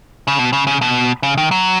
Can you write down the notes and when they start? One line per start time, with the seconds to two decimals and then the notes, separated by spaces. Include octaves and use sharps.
0.27 C#3
0.39 B2
0.53 C#3
0.67 C#3
0.81 B2
1.23 C#3
1.38 D#3
1.51 F#3